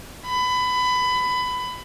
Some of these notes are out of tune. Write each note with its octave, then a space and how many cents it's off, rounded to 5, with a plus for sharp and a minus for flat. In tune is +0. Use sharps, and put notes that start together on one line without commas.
B5 +20